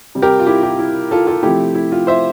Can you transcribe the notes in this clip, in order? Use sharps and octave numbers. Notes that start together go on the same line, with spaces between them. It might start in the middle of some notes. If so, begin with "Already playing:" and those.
C3 G3
G4 A#4
F4
E4 G4
E4 G4
E4
F4 A4
F4 A4
C3 F3 A3 E4 G4
E4
F4
C5 E5